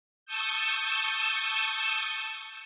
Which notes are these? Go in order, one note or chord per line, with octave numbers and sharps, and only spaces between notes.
A5 C#6 D#6 E6 G6